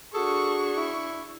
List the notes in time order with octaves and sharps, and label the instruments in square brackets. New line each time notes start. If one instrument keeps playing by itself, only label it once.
[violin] D4 C#6 [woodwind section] F#4 G#4 [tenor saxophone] A4
[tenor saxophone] E4